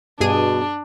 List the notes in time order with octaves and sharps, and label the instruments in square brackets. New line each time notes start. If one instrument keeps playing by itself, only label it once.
[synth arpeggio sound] G2 G#4 D#7 [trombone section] B2 [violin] D4